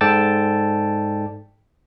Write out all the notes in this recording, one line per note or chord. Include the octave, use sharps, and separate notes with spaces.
G#2 A4 D5 G5 A5 A6